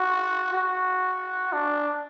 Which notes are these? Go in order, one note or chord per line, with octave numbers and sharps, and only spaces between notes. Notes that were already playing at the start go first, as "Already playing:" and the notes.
Already playing: F#4
F#4
D4